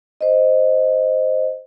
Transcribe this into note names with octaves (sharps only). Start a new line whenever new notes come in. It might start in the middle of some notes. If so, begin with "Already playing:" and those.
C5 D#5